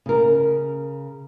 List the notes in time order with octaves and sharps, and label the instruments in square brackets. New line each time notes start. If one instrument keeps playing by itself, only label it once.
[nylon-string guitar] C#3 A#4